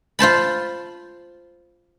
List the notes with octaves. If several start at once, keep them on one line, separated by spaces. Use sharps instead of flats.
F4 C5 A5 B5